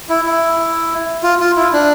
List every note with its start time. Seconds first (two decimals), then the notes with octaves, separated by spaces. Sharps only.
0.09 E4
0.26 E4
1.23 F4
1.40 F4
1.57 E4
1.73 D4